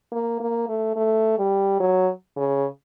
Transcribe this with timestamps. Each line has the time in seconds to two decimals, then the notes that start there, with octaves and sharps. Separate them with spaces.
0.12 A#3
0.40 A#3
0.68 A3
0.96 A3
1.39 G3
1.80 F#3
2.37 C#3